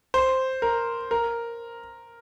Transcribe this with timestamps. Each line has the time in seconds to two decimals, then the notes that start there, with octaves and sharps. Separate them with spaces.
0.14 C5
0.62 A#4
1.11 A#4